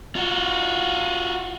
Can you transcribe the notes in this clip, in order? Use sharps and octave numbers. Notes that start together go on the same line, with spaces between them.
F4 F#4